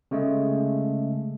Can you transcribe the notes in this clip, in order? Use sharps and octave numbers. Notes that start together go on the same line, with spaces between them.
C#3 G#3 A3